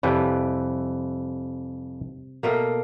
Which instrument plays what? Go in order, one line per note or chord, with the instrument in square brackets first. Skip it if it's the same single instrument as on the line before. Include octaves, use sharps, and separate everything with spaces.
[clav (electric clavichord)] F2 E3 B4 [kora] C3 G3
[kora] B2 A3 A#3